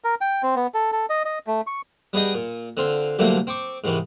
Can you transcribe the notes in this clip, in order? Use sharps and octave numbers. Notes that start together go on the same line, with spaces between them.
A#4
G5
C4
B3
A4
A4
D#5
D#5
A3
C#6
G3 B3 G#4 D#5 G5
A#2
D3 C4 F4
C2 D3 F#3 A3 A#3 C4
C4 G5 C#6 D6
G#2 C3 D#3 E3